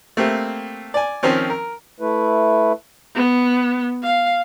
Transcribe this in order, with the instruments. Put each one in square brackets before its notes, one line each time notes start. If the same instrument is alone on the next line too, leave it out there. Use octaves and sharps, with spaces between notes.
[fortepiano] A3 A#3 C4 G4
D5 G#5
D#3 F3 C4 C#4
A#4
[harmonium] A3 E4 B4
[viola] B3
F5